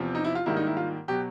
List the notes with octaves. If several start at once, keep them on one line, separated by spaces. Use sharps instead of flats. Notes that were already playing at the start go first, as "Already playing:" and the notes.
Already playing: E2 C3 F3
D#4
E4
F4
G#2 D#3 G3 A#3 E4
D#4
E4
F4
B2 F#3 G4